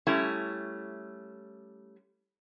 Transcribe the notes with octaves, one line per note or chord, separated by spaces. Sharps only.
G3 A3 C#4 E4